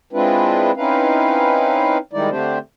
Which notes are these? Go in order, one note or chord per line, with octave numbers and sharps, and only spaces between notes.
G#3 C4 D4 E4 F4 B4
C4 C#4 D#4 E4 B4 F5
D#3 G3 G#3 D#4 E4 D5
D3 A3 C4 D4 G4 C5